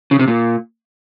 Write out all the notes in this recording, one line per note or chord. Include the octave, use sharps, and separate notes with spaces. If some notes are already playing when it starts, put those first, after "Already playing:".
C#3
C3
A#2